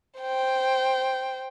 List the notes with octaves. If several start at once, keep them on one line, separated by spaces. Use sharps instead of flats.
C5 G5